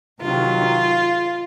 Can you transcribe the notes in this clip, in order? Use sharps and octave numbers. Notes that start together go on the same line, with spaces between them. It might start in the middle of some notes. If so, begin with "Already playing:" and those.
C3 D#3 F#3 F4